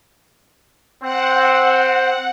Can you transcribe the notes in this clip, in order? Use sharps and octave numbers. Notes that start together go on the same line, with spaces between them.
C4 F#5